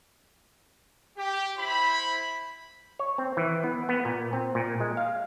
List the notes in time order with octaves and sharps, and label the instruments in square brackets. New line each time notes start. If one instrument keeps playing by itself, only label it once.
[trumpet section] G4
E4 C5 B5
[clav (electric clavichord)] C#5
C4
E3
B3
B3
A#2
C4
A#2
G#3
F5